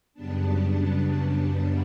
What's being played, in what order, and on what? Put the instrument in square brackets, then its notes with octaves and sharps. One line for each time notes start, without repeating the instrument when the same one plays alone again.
[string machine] F#2 C#3 G3 B3 D4 A5